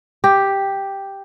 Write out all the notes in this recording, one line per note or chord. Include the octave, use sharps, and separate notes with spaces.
G4